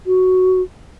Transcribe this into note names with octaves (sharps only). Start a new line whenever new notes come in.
F#4